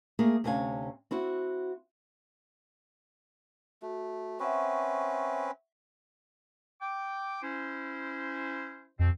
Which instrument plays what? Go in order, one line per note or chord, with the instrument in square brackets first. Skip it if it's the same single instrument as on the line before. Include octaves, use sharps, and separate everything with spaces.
[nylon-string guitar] A3 A#3 G#4 A#4
D2 C3 C4 C#4 F5 G#5
C4 E4 F#4
[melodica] A3 [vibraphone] F#4
[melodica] C4 C#4 B4 [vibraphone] E5 F#5 C#6
[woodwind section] G5 D6
C#4 E4 C5
[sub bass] F2 [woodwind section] B2 C4